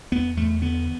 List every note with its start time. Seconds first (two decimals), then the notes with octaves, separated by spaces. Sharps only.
0.12 E2 B3
0.37 E2 A3
0.61 D3 B3